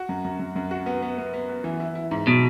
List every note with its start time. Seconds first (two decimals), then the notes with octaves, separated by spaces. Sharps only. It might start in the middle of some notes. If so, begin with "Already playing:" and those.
Already playing: F#4
0.09 F#2
0.25 F#2
0.39 F#2
0.56 F#2
0.71 F#4
0.86 B3
1.02 B3
1.18 B3
1.34 B3
1.49 B3
1.64 E3
1.80 E4
1.95 E4
2.11 G#2
2.27 B2 F#3